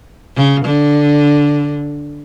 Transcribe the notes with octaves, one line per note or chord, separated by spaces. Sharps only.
C#3
D3